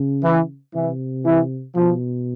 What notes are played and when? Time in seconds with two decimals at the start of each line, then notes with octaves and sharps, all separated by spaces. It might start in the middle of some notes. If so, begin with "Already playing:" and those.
Already playing: C#3
0.24 E3
0.74 C3 E3
1.26 E3
1.76 B2 F3